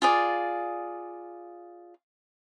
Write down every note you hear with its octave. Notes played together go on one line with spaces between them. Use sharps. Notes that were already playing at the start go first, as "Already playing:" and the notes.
F4 G#4 D5